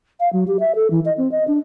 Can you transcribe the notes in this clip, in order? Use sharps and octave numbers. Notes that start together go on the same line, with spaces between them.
F5
F#3
G4
E5
A4
E3
D#5
C4
D#5
D4